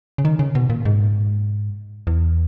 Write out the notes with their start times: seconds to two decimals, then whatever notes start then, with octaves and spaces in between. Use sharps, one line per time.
0.18 C#3
0.25 D#3
0.39 C#3
0.55 B2
0.70 A#2
0.85 G#2
2.07 E2